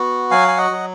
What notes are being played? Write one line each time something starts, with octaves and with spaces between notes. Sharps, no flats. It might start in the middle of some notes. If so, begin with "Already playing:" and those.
Already playing: B3 F#4
F#3 F5 G#5
G#5
D#5 F#5
F#3